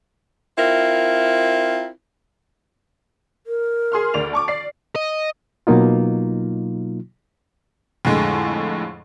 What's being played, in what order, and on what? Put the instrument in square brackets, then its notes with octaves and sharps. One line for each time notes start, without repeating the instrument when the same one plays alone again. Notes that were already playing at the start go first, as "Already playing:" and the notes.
[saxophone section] C4 E4 F4 A#4
[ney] A#4
[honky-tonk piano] G#4 C6 F6
D2 D5 F7
A5 C#6 D6
D5 C7
[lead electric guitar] D#5
[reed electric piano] B2 F#3 A#3 D#4 F4
[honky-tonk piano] F2 A2 D3 G#3